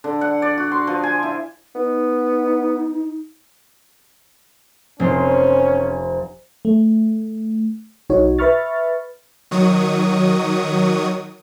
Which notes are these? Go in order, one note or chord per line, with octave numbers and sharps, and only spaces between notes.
D3
F#5
D5
F#4
C6
F3
G#5
E4
B3 D#4
F1 C4 C#4 C5
A3
B1 D#4 F#4 C#5
B4 E5 B5 C#6 F6 A6
D#3 F#3 C#6 D#6